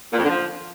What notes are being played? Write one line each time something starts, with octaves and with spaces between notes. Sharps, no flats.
A#2
F2
D3
F3